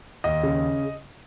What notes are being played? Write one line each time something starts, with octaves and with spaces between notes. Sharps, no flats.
D#2 D#5
C#3